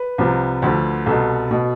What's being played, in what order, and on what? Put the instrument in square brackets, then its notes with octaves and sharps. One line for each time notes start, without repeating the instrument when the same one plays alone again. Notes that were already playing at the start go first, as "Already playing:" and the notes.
Already playing: [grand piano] B4
C2 C3 F3
D2 D3 F3
C2 B2 A4
B2